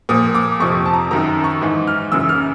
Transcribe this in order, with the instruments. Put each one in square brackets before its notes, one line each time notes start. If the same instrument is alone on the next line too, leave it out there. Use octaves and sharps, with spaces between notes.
[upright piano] A#2 F3 D#6
D6
F2 C3 F3 C#6
A5
A#5
F#2 D#3 A#5
C#6
G#2 E3
F6
F#2 C#3 E3 E6
F6